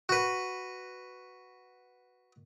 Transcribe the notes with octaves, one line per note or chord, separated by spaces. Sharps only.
F#4 B4